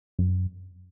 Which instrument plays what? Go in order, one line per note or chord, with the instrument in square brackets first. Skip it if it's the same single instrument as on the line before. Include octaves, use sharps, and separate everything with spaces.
[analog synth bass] F#2